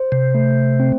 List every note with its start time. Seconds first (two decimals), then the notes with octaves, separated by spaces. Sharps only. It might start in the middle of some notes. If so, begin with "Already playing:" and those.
Already playing: C5
0.12 C3
0.34 A3
0.80 C4